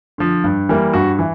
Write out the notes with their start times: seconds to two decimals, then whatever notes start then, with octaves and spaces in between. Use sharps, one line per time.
0.18 D3 F3
0.44 G2
0.69 E3 G3 A#3
0.94 G2 F#4
1.19 E3